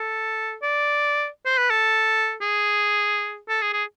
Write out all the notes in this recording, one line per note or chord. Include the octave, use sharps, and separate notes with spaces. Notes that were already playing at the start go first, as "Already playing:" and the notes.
Already playing: A4
D5
C5
B4
A4
G#4
A4
G#4
G#4